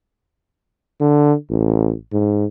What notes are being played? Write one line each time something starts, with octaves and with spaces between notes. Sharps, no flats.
D3
A1
G#2